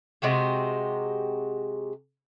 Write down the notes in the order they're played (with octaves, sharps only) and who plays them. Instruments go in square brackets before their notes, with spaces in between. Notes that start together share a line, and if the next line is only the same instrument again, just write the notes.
[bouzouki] C3 G#3 F#4 G4